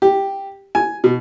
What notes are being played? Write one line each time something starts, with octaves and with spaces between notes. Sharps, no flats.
G4
G#5
B2